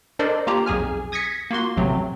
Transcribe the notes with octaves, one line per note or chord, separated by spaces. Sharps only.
D4 A4 A#4 C5 D5 D#5
A#3 F4 G4 A#5
B1 F2 G#4 G#5 F6
D#6 G#6 A#6 B6 C#7
A#3 F4 F#4 C6
A1 F2 C3 F#3 A3 C4